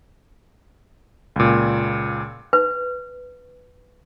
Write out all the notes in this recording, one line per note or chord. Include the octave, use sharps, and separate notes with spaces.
C#2 A#2
B4